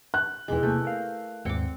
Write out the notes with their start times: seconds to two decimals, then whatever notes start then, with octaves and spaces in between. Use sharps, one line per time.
0.14 F#6
0.48 E2 B2 E3 G#3 D#5
0.63 C3 A3 A#3 G6
0.85 A#4 F5
1.45 D#2 G#2 C4 D6 C#7